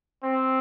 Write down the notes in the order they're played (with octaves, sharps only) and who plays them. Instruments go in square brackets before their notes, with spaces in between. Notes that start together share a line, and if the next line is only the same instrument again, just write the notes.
[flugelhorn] C4